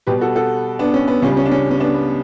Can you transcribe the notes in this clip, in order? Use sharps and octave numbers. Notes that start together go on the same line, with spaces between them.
B2 G3 B3 G4 B4
F#4 A4
F#4 A4
B3 D4
C#4
B3
C#2 C#3 G3 C#4
C#4
D4
C#4
C#4
B3 D4
B3